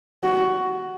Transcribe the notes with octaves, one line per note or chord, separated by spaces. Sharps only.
F#4